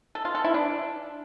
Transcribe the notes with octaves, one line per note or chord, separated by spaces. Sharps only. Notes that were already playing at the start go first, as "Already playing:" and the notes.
A4
F4
A4
E4
D4